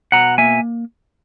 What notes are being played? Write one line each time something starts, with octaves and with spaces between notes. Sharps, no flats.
B2 F#5 A#5
A#3 E5 G#5